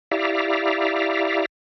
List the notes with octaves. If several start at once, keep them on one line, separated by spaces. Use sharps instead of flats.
E4 G4 D5 E5 F5 A#5